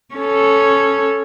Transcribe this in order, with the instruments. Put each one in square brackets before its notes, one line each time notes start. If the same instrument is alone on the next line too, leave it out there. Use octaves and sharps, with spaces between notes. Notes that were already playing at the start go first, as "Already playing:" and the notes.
[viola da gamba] C#4 A4